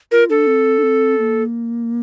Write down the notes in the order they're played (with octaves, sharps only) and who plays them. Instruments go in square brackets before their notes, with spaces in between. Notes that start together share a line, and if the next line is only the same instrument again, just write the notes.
[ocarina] F4 [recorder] A#4
[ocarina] D4 [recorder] A4
[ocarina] C4
D4
C4
A#3